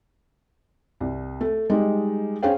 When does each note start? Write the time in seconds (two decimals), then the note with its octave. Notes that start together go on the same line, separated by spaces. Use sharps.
1.00 C2
1.41 A3
1.70 G3 G#3 D#4
2.43 C#4 G#4 C5 F5 G5